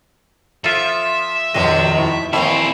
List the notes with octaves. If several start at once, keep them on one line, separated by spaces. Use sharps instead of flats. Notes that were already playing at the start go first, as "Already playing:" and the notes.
F3 F4 A4 E5
D#1 F2 B2 D#3 F#3 D#5 D#6
A2 E4
D#2 A2 E3 A#3 C4 E4 D#5 E5